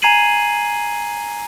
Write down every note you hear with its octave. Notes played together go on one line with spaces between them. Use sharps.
G#5 A#5 G#6 C7 D#7 F#7